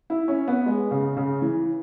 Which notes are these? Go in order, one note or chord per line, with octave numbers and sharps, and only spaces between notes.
E4
C#4
B3
G#3
C#3
C#3
E3